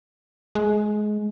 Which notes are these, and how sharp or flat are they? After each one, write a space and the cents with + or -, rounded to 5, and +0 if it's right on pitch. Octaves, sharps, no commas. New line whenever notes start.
G#3 +20